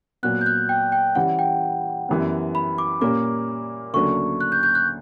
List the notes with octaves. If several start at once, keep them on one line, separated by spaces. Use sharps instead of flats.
A#2 F#3 B3 F#6
G6
F#6
G5
G5
E3 G3 C#4 F#5
G5
F#2 E3 G3 B3
B5
D6
A#2 G3 A#3 C#4 D6
D2 C#3 F#3 A#3 D4 C#6
F#6
G6
G6
F#6